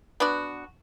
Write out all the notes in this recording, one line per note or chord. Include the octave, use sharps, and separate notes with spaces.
B3 D4 F#4